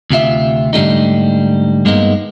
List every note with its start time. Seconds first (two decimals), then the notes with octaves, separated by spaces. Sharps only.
0.10 D2 C3 F4 E5
0.73 G#2 D3 G3 A3 D#4
1.85 G2 G#3 A#3 B3 D#4